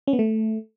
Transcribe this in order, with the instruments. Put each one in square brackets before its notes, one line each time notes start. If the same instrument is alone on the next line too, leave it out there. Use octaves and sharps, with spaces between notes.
[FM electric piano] C#4
B3
A3